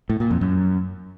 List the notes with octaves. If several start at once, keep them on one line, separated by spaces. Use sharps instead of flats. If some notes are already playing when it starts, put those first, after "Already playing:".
A2
A#2
F2
F#2